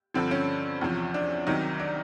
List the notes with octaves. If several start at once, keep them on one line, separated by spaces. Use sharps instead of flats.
G2 D3 F3 C4
C#4
E2 C3 F3
D4
C2 C3 D#3 F#3 D#4
D4